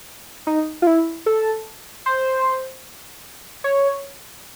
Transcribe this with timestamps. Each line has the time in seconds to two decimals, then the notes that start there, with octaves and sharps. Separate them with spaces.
0.47 D#4
0.82 F4
0.87 E4
1.26 A4
2.06 C5
3.64 C#5